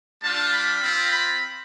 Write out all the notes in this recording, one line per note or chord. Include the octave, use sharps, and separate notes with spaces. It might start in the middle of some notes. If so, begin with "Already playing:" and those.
G3 D4 F4 A5
B5
C4 F4
B5